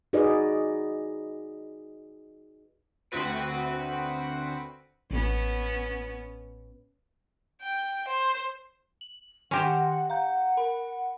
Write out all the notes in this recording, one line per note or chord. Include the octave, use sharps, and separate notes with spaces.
D#4 F#4 G#4 B4 D5 D#5
D2 C4 F#4 B4 D7
A1 B3 C#4
G5
C5
F#7
D#3 C#4 G4 C5 F#5 C6 A#6
F5 F#5 A#5 G6
A#4 B5